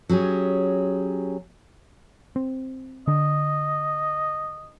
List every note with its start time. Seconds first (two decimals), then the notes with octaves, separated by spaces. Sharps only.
0.09 F#3 C#4 G4 G#4
2.36 C4
3.08 D3 D4 D#5